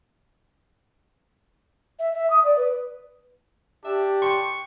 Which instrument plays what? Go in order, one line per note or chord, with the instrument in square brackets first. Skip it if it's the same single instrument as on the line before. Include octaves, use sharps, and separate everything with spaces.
[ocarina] E5
E5
D#6
D5
B4
[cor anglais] D4 [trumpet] G4 [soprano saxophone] E5
[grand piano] G5 C6 [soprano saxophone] C#6